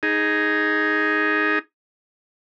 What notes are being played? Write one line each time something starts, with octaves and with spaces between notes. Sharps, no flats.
D#4 G#4